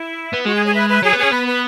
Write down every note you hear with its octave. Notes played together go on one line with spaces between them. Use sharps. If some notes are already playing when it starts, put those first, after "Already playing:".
Already playing: E4
B3
G#3 F#4
G#4
G#4 C#5
B4 E5
B4 E5
F#3 G#4 C#5
B3 G#4 C#5
C#4
B3 B4
B4